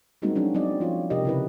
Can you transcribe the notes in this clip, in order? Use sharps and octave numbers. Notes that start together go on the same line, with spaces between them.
G3 G#3 A#3 C4 D#4 F#4
F#3 C#4 D4 F#4
F#3 C4 D#4 F#4 D5 D#5
F3 F4 C#5
C3 G4 A#4 D#5
C#3 E4 B4